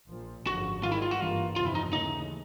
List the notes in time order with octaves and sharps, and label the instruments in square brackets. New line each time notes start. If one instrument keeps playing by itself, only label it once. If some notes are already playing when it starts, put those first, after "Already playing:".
[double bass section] A#1 A#2 F3
[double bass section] G#1 F#2 D3 F3 [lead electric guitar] F#4
[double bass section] G#2 D#3 G3 [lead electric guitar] F4
[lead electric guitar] E4
F4
F#4
[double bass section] G#1 G2 E3 G3 A#3 [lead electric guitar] F4
[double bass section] G1 F2 C3 E3 [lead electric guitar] F4
[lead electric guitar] E4
D#4
[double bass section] D#2 C#3 E3 A3 [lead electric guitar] D#4